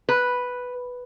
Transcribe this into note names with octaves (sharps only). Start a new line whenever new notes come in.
B4